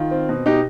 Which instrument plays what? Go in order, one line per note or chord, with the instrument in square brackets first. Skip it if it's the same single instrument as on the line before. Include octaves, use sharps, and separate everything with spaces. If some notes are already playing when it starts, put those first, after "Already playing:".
Already playing: [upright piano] D#3 F4
C4
B2
B2 D#4 G4